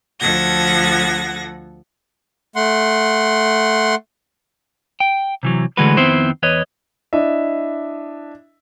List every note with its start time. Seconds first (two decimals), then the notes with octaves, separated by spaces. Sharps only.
0.19 D2 F3 A4 F#5 G#6 A#6
2.56 A3 F#5 C6
5.00 G5
5.43 C3 E3 F#3
5.77 D3 E3 G#3 A3 F#4 B4
5.97 F2 D#3 B3 C4 E4 C5
6.43 E2 B4 C#5 D#5
7.13 D4 E4 D#5 E5